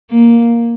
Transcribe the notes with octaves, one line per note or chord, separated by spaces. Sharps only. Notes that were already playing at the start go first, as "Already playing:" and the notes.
A#3